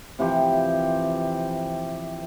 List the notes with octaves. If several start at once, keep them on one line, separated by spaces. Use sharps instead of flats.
C3 E3 F3 G4